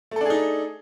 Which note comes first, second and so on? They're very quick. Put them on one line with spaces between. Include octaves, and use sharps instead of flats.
A3 A4 D4 G#4 D#4